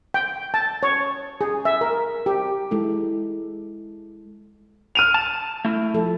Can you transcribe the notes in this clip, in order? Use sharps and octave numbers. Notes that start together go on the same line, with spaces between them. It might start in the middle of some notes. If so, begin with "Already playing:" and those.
G5
A5
C#5
G#4
E5
A#4
G4
G#3 E4 A4
F6 D#7 F7
A5
A3 E4
F3 A4